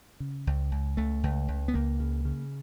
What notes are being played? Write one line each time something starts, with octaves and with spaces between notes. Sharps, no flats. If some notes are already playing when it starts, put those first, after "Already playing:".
C#3
C#2
C#2
C#2 A3
C#2
C#2
B3
C#2 A#3
C#3
C#3